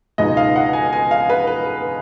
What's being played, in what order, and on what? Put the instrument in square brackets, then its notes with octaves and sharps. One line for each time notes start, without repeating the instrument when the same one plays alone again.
[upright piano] C#2 B2 G#3 D#4 D#5
F5
F#5
G#5
G#5
F5
B4
B4